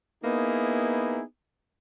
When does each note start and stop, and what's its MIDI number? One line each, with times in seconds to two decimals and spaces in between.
0.24 1.22 58
0.24 1.22 59
0.24 1.22 63
0.24 1.22 64
0.24 1.22 68